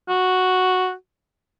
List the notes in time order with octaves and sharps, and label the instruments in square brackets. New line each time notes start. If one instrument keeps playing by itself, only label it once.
[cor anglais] F#4